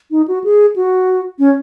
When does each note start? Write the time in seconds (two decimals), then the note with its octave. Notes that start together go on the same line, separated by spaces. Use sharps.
0.11 D#4
0.28 F#4
0.44 G#4
0.76 F#4
1.39 C#4